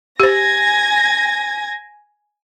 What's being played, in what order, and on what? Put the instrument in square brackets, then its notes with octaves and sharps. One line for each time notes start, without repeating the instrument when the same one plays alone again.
[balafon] G4 C5 [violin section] G#5 G#6 A#6